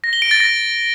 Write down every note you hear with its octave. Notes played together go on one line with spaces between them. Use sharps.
A#6
G7
D7
A6
A#6